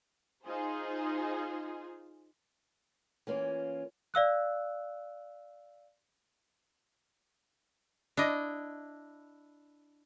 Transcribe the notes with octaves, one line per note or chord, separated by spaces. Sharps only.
D#4 F4 G#4 C5
E3 A#3 C#4 F4
D5 F5 E6 F#6
D4 E4 D#5